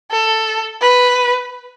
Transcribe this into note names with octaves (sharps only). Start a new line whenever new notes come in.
A4
B4